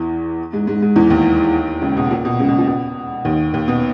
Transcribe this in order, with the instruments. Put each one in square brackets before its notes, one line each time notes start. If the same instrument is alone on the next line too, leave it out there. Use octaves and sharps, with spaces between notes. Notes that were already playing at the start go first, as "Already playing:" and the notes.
Already playing: [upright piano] E2 E3
G#2 G#3
G#2 G#3
G#2 G#3
E2 E3
D#2 D#3
C#2 C#3
B2
A#2
B2
C#2 C#3
B2
A#2
B2
D#2 D#3
D#2 D#3
B2 B3